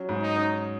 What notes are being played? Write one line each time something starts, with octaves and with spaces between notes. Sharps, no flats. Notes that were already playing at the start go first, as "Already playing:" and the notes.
Already playing: F#3 C#4
G#2
D#4
C#4